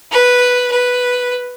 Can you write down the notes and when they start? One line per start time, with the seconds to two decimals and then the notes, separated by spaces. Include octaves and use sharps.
0.12 B4
0.71 B4